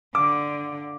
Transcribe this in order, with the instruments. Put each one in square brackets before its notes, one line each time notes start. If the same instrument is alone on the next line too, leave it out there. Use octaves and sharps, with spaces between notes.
[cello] D3 [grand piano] D6